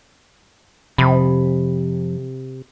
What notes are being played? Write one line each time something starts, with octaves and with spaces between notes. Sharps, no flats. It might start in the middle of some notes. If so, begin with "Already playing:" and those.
F2 C3 B5